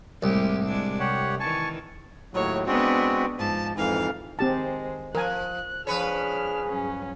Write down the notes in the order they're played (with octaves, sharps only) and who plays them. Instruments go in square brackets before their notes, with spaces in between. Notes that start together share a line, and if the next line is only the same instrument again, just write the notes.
[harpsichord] C2 [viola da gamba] A2 G#3 G4
[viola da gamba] G#3 D4
[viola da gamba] C3 [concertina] G4 C#5 F#5
[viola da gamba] D#3 E3 [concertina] G#5 A5 C#6
[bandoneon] D#2 A2 F#3 [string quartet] C#5
[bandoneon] G#3 C4 F#4 [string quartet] B3 D4
[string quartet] G#2 A5 [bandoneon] F3
[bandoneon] F2 G#2 E3 [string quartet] F5
[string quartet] D#3 G#3 C5 [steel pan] C4 G4 A5
[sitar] F3 [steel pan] A#4 G#5 [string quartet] F#6
[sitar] F3 B4 C#5 [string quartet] D4 F6 [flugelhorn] G#4
[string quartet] G2 F#3 C#4